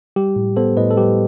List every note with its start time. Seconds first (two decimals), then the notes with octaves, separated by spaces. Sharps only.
0.16 G3 G4
0.36 A2
0.57 B3 A4 C5
0.77 A2 B4 D#5
0.91 A4
0.97 G3 G4 B4